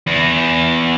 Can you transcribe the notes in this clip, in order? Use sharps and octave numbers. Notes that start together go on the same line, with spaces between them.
E2